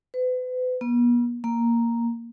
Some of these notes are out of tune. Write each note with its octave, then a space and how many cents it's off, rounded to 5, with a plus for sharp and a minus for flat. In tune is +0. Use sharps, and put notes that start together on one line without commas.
B4 +40
B3 -40
A#3 +0